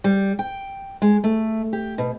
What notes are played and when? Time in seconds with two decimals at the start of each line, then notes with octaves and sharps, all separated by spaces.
0.04 G3
0.39 G5
1.02 G#3
1.24 A3
1.73 G4
1.98 B2